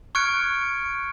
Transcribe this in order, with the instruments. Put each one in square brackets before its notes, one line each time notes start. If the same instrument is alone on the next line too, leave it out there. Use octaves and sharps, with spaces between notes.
[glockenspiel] C#6 F6 F#6 G#6 C#7 D7